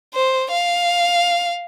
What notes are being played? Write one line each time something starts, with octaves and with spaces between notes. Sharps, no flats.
C5
F5